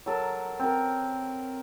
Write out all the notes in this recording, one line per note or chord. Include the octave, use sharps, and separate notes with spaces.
F#3 A4 A#4
C4 A#4